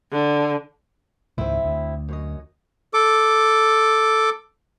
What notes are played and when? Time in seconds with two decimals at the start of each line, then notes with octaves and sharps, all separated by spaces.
0.12 D3
1.38 C#2 G#2 D#3 C4 E4
1.64 D2
2.08 F#2 C#5 D#5
2.94 A4 D6